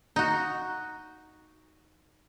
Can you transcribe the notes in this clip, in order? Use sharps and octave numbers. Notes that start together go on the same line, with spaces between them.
D#4 F#4